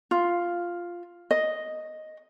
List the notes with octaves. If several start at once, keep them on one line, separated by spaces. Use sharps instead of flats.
F4
D#5